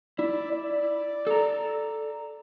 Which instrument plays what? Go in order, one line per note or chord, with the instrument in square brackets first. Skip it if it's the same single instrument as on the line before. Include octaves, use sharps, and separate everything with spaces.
[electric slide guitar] E4 [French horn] D5
[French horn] D5
[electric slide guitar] A4 A#5